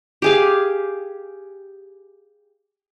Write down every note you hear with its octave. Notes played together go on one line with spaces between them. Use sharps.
G4 G#4 F5